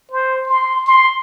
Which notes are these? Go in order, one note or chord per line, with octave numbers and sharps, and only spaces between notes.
C5
C6
C6